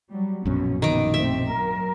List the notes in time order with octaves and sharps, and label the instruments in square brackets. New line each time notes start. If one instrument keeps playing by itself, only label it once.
[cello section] F#3 G3
[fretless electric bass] A#1 F#2 B2 [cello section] C#4
[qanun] D#3 D6 [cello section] B3
[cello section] A3 C4 [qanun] E5
[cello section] F#3 A#4